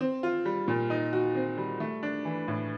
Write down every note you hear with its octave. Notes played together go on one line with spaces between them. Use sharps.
C4
F4
G3
A#2
D#4
F#4
C4
G3
A3
D4
E3
A2